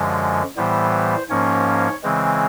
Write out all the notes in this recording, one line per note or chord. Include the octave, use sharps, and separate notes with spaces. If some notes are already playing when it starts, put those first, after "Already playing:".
Already playing: F#2 D3 F3 G#3
A2 E3 G3 B3 C5
G#2 F3 A#3 C#4 C#5
C#3 E3 G#3 C4